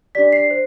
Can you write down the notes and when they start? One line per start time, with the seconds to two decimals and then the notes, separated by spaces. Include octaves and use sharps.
0.15 D4 G4 D5 B6
0.33 C7
0.50 C5